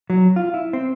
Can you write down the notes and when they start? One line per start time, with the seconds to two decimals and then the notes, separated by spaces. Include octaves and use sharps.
0.10 F#3
0.36 F4
0.54 E4
0.73 C4